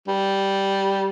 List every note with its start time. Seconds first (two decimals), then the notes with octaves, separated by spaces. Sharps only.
0.07 G3